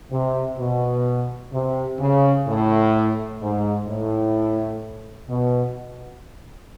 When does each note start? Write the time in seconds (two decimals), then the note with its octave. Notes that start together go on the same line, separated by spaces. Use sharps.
0.11 C3
0.58 B2
1.52 C3
2.00 C#3
2.47 A2
3.41 G#2
3.87 A2
5.29 B2